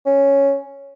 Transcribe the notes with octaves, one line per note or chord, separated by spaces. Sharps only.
C#4